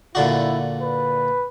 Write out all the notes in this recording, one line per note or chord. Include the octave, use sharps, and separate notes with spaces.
A#2 D3 E4 F#4
B4